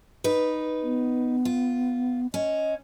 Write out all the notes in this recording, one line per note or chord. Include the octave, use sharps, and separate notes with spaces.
D#4 B4
B3
F4
C#4 D#5